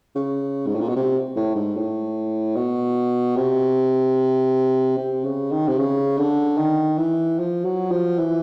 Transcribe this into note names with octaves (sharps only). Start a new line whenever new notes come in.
C#3
G#2
A2
A#2
B2
C3
A2
G#2
A2
B2
C3
C3
C#3
D#3
C3
C#3
D3
D#3
E3
F3
F#3
F3
E3